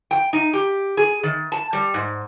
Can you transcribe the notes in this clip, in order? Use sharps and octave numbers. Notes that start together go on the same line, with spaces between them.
G5
D#4
G4
G#4
D#3
A5
G3
G#2